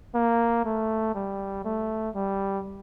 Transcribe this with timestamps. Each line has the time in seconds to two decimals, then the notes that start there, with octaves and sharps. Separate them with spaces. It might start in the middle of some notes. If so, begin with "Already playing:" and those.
0.15 A#3
0.65 A3
1.15 G3
1.65 A3
2.15 G3